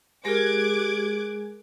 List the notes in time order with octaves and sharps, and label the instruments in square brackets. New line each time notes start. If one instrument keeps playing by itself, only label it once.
[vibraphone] G#3 G#4 [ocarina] G4 [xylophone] A#4 A#6 [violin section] D6 F#6 G#6